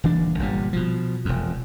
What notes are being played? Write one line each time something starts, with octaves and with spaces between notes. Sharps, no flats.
D#1 E3 D4
G1 A#2 G3
B2 F3
E1 F2